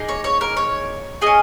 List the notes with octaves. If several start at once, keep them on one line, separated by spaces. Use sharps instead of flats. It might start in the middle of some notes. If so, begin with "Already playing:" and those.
Already playing: A#3 D#4 G#4
C#5
C#5
A#4
C#5
C#4 G#4 D#5